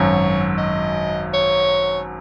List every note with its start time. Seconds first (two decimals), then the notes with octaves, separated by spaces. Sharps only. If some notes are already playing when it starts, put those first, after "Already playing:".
Already playing: G#1 F#2 F#3 C#5
0.58 D#5
1.34 C#5